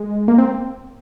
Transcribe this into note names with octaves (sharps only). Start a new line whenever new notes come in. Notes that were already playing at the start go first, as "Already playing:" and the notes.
Already playing: G#3
A#3
C4